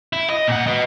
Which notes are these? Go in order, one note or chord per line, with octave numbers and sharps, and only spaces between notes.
E4
D#5
A#2 F#5
B4 D#5